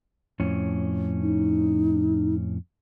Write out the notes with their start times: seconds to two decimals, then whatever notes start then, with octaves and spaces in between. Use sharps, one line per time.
0.40 F2 A2 C#4
1.22 D#4